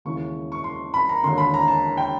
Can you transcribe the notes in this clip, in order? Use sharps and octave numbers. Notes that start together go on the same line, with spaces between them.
E1 D#2 C#3 E3 C#6
C#6
C6
B5
A#5
E1 D#2 D3 C6
B5
A#5
A5
G5